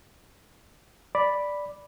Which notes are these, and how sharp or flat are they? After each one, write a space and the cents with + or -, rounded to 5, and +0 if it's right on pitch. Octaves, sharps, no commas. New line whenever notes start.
D5 +0 B5 +0